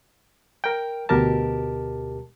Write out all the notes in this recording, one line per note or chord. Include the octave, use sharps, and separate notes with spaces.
A#4 G5
D2 B2 G4 A#4 A5